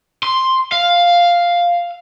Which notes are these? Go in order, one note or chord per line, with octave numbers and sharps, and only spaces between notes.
C6
F5